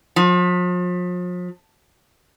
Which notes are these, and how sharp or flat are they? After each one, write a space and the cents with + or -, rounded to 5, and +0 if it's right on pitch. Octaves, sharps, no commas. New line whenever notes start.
F3 +40